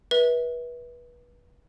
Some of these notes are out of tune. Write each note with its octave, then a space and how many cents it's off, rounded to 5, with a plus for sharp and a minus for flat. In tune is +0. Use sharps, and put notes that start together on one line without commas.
B4 -30 E5 -30